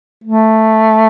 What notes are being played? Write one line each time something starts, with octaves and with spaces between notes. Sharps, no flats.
A3